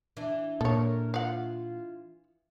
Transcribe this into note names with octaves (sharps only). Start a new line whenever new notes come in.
E3 D4
A#2 A4 A#4 C#5
F4 F5 F#5